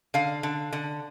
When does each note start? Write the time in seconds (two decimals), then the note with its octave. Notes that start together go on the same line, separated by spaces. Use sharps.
0.14 D3 F5
0.43 D3
0.73 D3